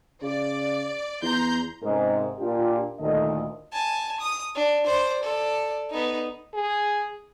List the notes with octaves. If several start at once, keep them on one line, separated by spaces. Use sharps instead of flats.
C#3 D5
E2 A#5 C6 G6
G#2 C3 G#3 C#4 A#4
A#2 D4 F4 G4
D2 A#2 D#3 A4 D#5
G#5 A5
D#6
D4
C5 D5
A4 D5
B3 D#4
G#4